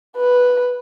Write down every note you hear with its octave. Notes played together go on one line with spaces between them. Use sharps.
B4